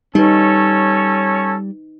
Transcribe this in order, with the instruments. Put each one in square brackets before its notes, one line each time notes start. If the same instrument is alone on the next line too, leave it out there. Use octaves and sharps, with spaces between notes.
[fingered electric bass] G3 [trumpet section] C#4 A4 C#5 [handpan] D#4 B4